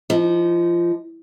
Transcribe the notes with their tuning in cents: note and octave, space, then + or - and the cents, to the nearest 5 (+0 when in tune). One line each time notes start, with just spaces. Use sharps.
F3 -25 D#4 +0